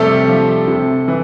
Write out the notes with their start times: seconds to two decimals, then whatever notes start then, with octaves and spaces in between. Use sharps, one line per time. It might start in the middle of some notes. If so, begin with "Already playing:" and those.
Already playing: C3 F3 G3 A3 G4 A4
0.28 F3
0.68 C3
1.08 E3